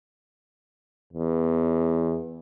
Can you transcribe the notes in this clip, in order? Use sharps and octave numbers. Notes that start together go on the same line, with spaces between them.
E2